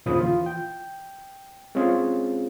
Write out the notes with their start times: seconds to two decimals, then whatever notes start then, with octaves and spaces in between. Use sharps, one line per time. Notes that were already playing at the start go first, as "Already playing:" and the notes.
0.06 D#2 A#2 C#3 F3 B5 D#6
0.20 E3 F4
0.46 G5
1.75 G#3 C4 C#4 F4 G#4